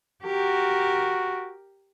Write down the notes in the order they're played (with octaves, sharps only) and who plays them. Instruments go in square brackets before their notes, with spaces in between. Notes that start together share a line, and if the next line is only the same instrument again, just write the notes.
[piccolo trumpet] F#4 [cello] G4 A#4